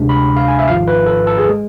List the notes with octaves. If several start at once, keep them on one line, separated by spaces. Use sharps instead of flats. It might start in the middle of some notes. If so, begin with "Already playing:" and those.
Already playing: D2 C3 G#3 D4
B5
F5
G#5
E5
G#1 G#2 F3 F5
B4
A4
A4
G#4
G#3